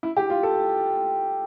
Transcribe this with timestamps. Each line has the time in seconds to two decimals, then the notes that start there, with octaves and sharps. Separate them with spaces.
0.03 E4
0.17 G4
0.30 F4
0.43 A4